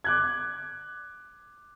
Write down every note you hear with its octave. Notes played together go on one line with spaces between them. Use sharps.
D6 F#6 G#6